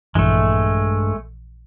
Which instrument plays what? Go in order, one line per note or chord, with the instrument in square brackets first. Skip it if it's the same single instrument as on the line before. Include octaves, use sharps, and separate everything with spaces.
[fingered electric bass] A#1 E3 [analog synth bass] G2 [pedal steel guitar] G#3 A3